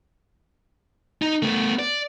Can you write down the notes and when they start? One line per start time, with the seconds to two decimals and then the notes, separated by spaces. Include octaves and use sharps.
1.22 D#4
1.42 A3 B3
1.79 D5